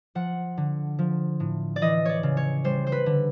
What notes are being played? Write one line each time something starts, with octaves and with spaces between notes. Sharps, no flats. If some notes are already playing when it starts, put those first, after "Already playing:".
F3 F#5
D3
F3
A2
D5
E3 D#5
C#5 D5
C#3
C#5
G3 C5
C5
B4
D3